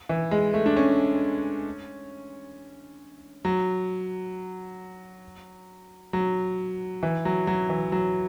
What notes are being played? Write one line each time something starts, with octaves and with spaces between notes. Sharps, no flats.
E3
G#3
A3
D4
C#4
F#3
F#3
E3
F#3
F#3
E3
F#3